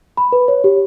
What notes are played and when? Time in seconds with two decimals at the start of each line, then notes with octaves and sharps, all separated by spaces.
0.17 B5
0.32 B4
0.48 C#5
0.64 G4